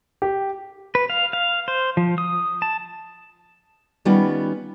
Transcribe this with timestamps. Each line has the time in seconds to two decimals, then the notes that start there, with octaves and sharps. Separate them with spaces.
0.22 G4
0.95 B4
1.10 F5
1.33 F5
1.68 C5
1.97 F3
2.18 D#6
2.62 A5
4.05 D#3 G3 B3 C#4 F4